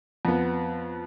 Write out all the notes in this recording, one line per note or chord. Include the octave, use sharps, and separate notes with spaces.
F2 B3